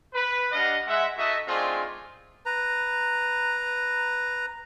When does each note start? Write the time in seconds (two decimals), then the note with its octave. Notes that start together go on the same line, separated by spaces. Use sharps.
0.14 B4
0.52 G3 D4 D#5 F5 F#5
0.86 G#3 E5 F#5
1.16 D#4 F#4 A4 D#5 E5
1.46 A3 C4 D4 D#4 F4 G#4
2.46 B4 A#5